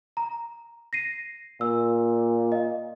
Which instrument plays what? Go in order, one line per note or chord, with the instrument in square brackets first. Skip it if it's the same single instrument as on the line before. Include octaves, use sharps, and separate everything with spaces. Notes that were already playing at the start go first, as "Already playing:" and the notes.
[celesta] A#5
A#6 C7 D#7
[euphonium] A#2 [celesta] E6
[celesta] D#5